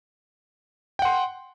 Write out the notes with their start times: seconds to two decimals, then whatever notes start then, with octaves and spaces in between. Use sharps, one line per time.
0.99 G5
1.02 F#5
1.05 C6